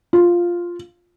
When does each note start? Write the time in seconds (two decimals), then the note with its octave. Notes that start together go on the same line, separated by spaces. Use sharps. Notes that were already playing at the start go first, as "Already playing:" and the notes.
0.13 F4